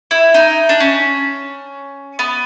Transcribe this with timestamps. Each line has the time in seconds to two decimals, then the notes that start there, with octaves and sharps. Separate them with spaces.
0.11 E4
0.34 D#4
0.69 D4
0.80 C#4
2.19 B3